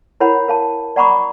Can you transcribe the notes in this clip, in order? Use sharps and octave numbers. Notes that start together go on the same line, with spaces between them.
E4 A#4 C#5 F#5 B5
A#4 F5 A5
D5 F#5 A#5 B5 C#6 D6